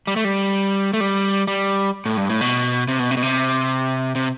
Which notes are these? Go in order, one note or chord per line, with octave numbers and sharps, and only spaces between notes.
G3
A3
G3
A3
G3
G3
A2
G2
A2
B2
C3
B2
C3
B2
C3
C3